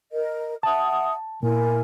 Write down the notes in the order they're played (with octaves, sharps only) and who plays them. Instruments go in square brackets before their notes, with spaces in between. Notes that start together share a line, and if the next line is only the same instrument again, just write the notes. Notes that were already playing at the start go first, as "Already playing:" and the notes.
[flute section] A#4 D#5
[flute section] E5 F#5 D#6 [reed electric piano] A5
[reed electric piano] A#2 [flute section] E4 A#4 G#5